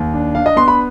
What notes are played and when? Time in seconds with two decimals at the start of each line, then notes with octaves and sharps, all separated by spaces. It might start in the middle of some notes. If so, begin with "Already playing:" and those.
Already playing: D#2
0.14 D4
0.35 D4 F5
0.46 D#5
0.56 B3 C6
0.68 B5